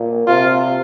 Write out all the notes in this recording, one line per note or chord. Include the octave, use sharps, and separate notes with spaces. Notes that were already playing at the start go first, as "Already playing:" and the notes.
Already playing: A#2
C3 F4